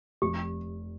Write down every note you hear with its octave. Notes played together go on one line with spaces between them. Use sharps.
F1 G4